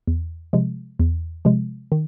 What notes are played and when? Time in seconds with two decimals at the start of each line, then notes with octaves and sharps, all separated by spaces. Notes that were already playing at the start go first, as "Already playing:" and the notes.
0.08 E2
0.53 C3 F3 G#3
0.99 E2
1.45 C3 F3 G#3
1.92 D#3